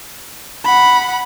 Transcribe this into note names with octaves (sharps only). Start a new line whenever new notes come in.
F#5 B5